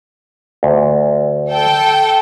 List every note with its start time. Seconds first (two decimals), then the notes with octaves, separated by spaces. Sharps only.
0.63 D2
1.50 A4 G5